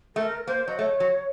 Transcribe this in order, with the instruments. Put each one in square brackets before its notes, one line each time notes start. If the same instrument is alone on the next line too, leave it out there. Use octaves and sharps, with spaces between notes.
[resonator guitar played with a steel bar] A3 [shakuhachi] A#4
[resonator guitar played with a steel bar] A#3 [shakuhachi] C5
[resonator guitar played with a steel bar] F#3 [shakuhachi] D#5
[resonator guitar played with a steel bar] A3 [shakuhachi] C#5
[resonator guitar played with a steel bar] F#3